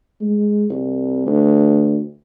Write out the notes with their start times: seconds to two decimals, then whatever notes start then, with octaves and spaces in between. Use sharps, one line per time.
0.21 G#3
0.70 C2
1.26 D2